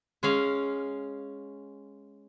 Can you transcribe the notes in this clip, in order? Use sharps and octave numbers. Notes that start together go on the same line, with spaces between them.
G#3 C#4 F5